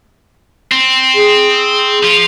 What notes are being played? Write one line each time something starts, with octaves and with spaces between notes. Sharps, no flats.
C4
G#4
F3 F4